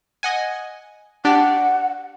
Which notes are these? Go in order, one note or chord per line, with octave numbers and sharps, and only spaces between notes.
D#5 F#5 G#5
D4 G4 D5 F#5